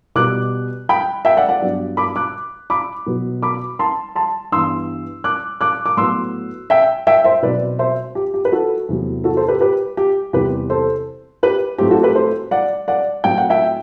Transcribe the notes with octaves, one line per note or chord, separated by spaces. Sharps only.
B2 G3 B3 D6 F#6
G5 B5
E5 G5
D5 F#5
D5 F#5
G2 F#3 B3
B5 D6
D6 F#6
B5 D6
B2 F#3 B3
B5 D6
A5 C6
A5 C6
G2 E3 B3 C6 E6
D6 F#6
D6 F#6
D6
A2 F#3 B3 C6 E6
E5 G5
E5 G5
C5 E5
B2 F#3 C4 B4 D5
C5 E5
G4
G4
B4
F#4 A4
E2 C3 F#3 A3
F#4 A4
A4 C5
G4 B4
G4 B4
G4
E2 C3 G3 C4 G4 B4
A4 C5
G4 B4
A2 F#3 A3 C4 G4
F#4 A4
G4 B4
A4 C5
D5 F#5
D5 F#5
A2 F#3 C4 G5
F#5
E5 G5